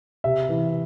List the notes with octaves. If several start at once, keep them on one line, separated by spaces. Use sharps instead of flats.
C3 E5
E3